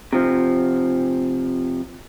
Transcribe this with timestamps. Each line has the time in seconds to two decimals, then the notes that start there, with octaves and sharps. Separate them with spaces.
0.13 C3 F3